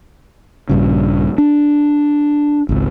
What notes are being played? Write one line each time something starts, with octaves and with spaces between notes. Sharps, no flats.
A#1 G2 C#3
D4
G#1 C#2